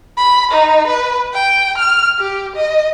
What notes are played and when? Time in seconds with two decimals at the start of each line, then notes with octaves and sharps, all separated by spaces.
0.17 B5
0.51 D#4
0.87 B4
1.33 G5
1.78 F6
2.19 G4
2.56 D#5